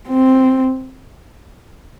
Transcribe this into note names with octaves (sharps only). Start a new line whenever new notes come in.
C4